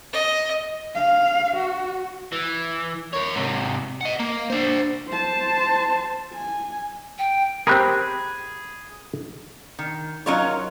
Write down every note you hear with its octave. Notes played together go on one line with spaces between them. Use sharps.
D#5
F5
F#4
E3
A#4 C#5
G#2 C3
D#5 F#5
A#3
D4 C5
C5 A5
G#5
G5
C4 G4 G#4 A#4 B5 F#6
D#3
F#3 C#4 D#4 F4 A#4 C#5